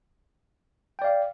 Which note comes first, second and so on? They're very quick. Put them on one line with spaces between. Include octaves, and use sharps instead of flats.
G5 D5 F5